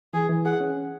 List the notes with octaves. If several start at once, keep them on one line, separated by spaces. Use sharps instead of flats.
E3 G#4
E3
G#4 F#5
C#4